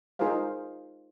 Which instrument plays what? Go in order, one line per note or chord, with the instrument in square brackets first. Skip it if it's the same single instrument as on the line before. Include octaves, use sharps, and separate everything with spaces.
[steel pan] D#4 F4 G#4 A#4 C5 F5